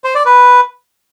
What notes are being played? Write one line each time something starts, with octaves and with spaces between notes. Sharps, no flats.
C5
D5
B4